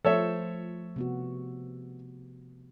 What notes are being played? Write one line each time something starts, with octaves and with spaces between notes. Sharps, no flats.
F3 A3 A4 C5 C#5 E5
C3 B3 F#4